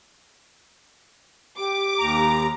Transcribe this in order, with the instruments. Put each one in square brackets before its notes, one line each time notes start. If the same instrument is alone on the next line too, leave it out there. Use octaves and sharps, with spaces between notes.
[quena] G4 [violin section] D6
[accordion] D#2 A#5